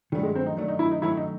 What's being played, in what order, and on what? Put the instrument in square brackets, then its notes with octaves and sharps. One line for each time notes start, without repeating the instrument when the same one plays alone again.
[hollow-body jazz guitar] D#3 F#3 A3 [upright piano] G3
[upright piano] G#3
C4
D#4
[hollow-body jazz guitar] D#3 F#3 A3 [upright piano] D4
[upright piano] D#4
E4
D#4
[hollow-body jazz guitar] D#3 F#3 A3 [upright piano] E4
[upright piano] D#4